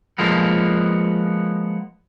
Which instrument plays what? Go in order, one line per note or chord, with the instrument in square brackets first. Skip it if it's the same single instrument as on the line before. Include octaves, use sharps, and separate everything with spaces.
[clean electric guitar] F3 G#3 A#3 B3